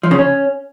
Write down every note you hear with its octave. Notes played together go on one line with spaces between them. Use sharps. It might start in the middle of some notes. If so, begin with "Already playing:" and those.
F3
C#3
C#4